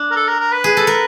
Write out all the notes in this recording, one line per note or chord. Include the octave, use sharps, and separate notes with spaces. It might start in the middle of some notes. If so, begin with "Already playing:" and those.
Already playing: D4
A#4
A4
A#4
A#4
B4
G#4
A4
A#4